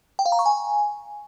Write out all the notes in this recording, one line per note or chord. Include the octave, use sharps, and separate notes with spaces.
G5
F5
A#5
C#6
G#5